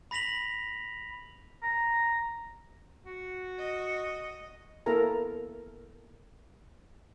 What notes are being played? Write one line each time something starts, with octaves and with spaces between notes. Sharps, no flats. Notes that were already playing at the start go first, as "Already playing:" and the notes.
B5 A#6 B6 F7 F#7
A#5
F#4
D#5
A#3 B3 E4 A4 A#4 A#5